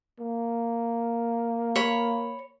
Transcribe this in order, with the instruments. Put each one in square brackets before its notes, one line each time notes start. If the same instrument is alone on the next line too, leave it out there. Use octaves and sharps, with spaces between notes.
[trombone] A#3
[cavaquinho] C#5 B5